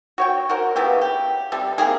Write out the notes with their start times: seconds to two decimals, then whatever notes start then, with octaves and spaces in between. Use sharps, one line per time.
0.18 F#4 C#5 G5
0.49 F#4 A#4 C5
0.76 C#3 B3 E4 G4
1.02 G4
1.52 C3 G3 A4
1.78 C3 A#3 G4 G#4